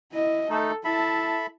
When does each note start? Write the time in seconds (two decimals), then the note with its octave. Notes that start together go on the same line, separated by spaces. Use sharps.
0.12 E4 D#5
0.50 A3 D#4 A4
0.85 E4 A4 E5 A5 B5